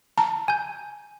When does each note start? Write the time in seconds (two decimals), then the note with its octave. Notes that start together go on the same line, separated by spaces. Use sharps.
0.18 A5 A#5
0.48 G#5 G6